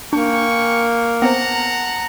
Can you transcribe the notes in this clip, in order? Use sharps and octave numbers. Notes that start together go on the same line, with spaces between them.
A#3 D4 G5 G#5 C#6
B3 C4 C5 F#5 A5 A#5